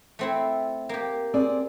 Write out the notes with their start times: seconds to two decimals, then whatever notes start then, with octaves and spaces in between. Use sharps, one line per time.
0.19 A3 C4 E4
0.89 A#3 G4
1.34 C4 G#4 D5